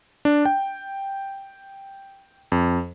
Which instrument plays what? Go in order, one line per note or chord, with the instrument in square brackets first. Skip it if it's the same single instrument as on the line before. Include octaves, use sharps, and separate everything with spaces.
[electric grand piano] D4
G5
F2